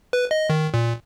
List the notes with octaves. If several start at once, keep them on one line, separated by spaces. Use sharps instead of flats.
B4
D#5
D#3
A#2